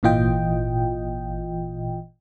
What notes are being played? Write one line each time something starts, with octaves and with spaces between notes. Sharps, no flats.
G#1 A#2 E3 F4 D#5 G5